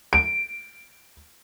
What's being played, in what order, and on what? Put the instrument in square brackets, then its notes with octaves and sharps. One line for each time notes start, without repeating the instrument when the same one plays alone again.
[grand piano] D7